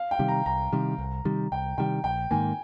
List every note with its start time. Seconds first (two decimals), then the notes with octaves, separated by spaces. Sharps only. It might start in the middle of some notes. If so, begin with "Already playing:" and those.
Already playing: F5
0.11 G5
0.19 C3 D#3 G3
0.28 A#5
0.46 C2 A#5
0.73 C3 D#3 G3
0.98 C2
1.25 C3 D#3 G3
1.52 C2 G5
1.78 C3 D#3 G3 G5
2.04 A#1 G5
2.31 G#2 D#3 A#3 G#5